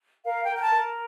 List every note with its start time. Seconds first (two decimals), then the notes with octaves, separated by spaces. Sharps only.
0.24 A#4 F5
0.44 G5
0.49 A#4
0.56 G5
0.61 A5
0.74 A#4